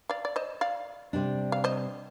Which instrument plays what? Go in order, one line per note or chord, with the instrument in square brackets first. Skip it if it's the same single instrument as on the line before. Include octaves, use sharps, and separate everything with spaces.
[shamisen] D5 F5
D5
C5 D#5
D5 F5
[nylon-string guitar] C3 G3 D4
[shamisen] F5
C5 D#5